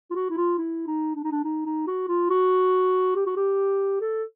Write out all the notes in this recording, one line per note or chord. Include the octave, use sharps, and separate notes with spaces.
F4
F#4
E4
F4
E4
D#4
D4
D#4
D4
D#4
D#4
F#4
F4
F#4
G4
F#4
G4
A4